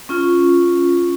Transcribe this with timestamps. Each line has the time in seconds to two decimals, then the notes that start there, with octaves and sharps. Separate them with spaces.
0.09 C#4 F4